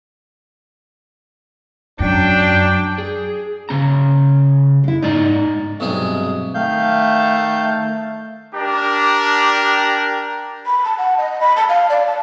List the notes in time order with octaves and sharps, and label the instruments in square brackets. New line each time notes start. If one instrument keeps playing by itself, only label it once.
[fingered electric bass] F#2 C#4 [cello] F#3 G5 [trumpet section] D4
[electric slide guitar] G#4
C#3 C#4 A#5
[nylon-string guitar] G#3 E4
[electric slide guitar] G#2 D5 A#5 [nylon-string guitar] D#4
[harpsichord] B1 G2 C3 G#3 G#4
[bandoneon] D#3 F5 G6 [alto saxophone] A3
[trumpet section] D4 G4 A#4
[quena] B5
A5
F#5
D#5
B5
A5
F5
D5
A5